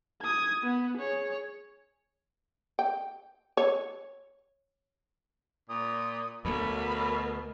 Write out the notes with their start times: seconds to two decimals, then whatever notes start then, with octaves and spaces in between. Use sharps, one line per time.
0.22 D#6 G#6
0.64 B3
0.98 G#4 C#5
2.79 G5
3.57 C#5
5.69 A#2 D#6
6.45 D2 B2 A3 A#4 B5